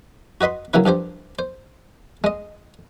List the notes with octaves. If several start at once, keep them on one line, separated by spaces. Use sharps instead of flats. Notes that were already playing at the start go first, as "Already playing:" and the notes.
F#4 B4 D#5 B5 C6
C#3 F#3 A#3 E4 B4
G2 F3 G4 C5
C5
G#3 D#5